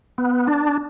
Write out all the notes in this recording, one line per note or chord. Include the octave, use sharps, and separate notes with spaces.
B3
D4